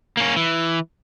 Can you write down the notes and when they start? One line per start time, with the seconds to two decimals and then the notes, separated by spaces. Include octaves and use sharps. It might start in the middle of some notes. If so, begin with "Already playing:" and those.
0.17 A#3 C#4
0.37 E3